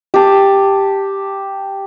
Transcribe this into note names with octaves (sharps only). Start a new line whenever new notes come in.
G4 A5